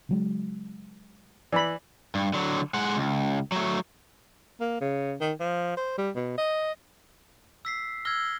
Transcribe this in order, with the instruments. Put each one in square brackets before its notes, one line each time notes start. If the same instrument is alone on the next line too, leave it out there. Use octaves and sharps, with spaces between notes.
[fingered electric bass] C#3 F#3 G#3
[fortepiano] E3 [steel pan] D5 B5
[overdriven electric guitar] G2
D3 F#3
G#3 F#5
C#2
F#3 A3
[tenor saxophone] A#3
C#3
D#3
F3
C5
G3
B2
D#5
[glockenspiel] E6 B6 C7
[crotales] E6 A#6 G7 [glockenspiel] F6 G#6